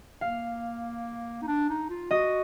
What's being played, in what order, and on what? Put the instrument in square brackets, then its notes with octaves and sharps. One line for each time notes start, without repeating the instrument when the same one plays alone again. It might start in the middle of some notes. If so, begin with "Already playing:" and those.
[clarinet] A#3 [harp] F5
[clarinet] D#4
D4
D#4
F4
[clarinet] F#4 [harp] D#5